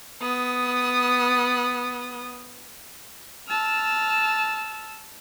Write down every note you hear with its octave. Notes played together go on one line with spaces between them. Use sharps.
B3 D#6
A5 E6 F6